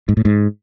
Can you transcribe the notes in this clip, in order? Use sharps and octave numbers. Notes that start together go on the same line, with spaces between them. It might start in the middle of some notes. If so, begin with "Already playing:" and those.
G#2
A2
G#2